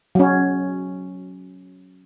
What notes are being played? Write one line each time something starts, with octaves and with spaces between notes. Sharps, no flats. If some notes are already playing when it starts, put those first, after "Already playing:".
F#3 C#4